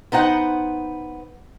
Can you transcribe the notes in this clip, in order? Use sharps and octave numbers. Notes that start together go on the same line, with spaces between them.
B3 D#4 C5 F#5